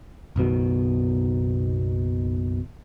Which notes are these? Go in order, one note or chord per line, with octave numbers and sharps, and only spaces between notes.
F#1 B1 B2 D#3